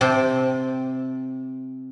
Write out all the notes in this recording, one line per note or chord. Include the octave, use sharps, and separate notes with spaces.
C3 G5 A5